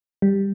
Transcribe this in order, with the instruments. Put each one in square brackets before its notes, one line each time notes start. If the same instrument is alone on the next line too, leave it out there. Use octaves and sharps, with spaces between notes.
[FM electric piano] G3